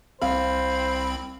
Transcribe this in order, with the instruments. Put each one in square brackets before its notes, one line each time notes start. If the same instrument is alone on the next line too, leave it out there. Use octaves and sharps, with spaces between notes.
[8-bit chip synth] C2 C4 B5 [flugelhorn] C5 [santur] F5